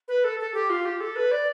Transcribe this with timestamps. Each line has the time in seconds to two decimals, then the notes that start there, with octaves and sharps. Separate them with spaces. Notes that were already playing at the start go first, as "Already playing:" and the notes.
0.08 B4
0.24 A4
0.40 A4
0.54 G4
0.70 F4
0.85 G4
1.00 A4
1.16 B4
1.31 D5